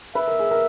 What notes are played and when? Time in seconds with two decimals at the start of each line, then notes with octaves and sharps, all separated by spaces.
0.15 B4 E5
0.27 A#4
0.39 G#4
0.51 A#4